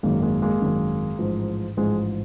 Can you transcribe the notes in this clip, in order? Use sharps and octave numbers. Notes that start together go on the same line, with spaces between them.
G#1 F#2 D#3 G#3 A#3
G#3 A#3
G#3 A#3
G#1 F#2 D#3
A1 G#2 F3
A1 G#2 F3 G#3